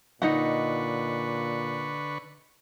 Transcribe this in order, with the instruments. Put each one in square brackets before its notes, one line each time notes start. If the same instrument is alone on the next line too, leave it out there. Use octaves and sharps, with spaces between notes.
[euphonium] A#2 [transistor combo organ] D3 B4 C#6 [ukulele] D#4 D#5 F#5